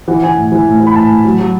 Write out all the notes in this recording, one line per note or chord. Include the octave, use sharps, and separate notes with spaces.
E3 F#5
E3 G#5
A2
E3
A2
E3
B5
A2 A5
A2
F#3
F#3